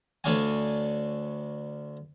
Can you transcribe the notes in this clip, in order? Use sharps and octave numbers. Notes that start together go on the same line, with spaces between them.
D2 D4 C#5 F5 G#5